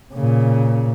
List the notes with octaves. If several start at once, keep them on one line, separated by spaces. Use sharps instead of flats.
A#2 C#3